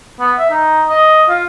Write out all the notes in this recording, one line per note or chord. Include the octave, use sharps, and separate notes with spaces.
B3
E5
D#4
D#5
F4